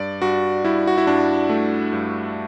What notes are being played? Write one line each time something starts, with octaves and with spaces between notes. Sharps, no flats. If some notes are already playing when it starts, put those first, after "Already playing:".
Already playing: G2 D5
G2 F#4
G2 E4
F#4
E4
G2 D4
A3
G2